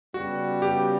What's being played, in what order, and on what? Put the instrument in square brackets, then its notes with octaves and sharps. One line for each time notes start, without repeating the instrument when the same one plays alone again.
[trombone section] C#3 G3 B3 [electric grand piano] F#4
[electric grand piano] G4